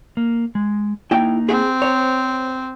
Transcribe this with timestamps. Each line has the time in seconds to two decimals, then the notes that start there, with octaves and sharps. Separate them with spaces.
0.17 A#3
0.55 G#3
1.11 A#3 D#4 E4 G5
1.49 C4 G#4
1.82 C5 C#5 A#5